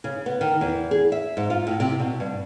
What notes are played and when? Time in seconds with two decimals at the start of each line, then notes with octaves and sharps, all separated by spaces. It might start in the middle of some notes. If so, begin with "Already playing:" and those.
0.04 C#3
0.26 B3
0.41 D#3
0.61 E2
0.91 G#4
1.12 E5
1.37 G#2
1.50 F4
1.67 A2
1.80 C3
2.00 B2
2.20 G2